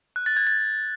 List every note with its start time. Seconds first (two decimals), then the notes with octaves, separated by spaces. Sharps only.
0.16 F#6
0.26 A6
0.37 G#6
0.47 A6